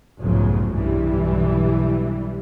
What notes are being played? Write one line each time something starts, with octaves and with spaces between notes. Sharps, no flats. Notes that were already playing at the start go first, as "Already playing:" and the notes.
F1 B1 G#2 C#3 F3 F#3
B1 G2 E3 G3